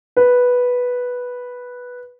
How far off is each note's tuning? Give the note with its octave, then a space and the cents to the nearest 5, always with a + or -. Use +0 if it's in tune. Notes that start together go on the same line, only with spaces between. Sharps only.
B4 -5